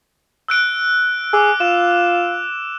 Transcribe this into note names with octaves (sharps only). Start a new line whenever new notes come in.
E6 F#6 D7
G#4 D6 E6
F4 E7